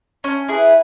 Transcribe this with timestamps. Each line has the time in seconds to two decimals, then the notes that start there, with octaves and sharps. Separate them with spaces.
0.24 C#4
0.48 E4 G#4 B4